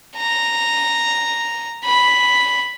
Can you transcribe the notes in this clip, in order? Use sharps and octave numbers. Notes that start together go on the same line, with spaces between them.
A#5
B5